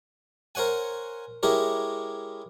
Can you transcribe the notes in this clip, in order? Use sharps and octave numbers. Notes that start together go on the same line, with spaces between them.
A#4 C5 C#5 F#5 G#5
G#3 E4 G4 A#4 C#5